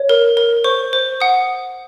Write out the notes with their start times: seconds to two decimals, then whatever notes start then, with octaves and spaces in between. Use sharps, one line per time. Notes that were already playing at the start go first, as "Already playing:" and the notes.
Already playing: C#5
0.09 A#4
0.37 A#4
0.64 C5 C#6
0.93 C5
1.20 F#5 D#6